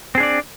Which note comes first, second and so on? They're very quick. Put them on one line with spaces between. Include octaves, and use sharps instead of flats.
C4 G#4 D4 D5